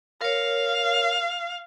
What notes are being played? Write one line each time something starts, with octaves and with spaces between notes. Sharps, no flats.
A#4 C#5 F5